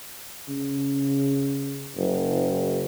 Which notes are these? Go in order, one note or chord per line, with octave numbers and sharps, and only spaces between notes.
C#3
F#1